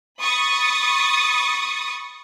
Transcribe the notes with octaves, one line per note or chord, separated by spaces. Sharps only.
B5 C#6 D#6 A6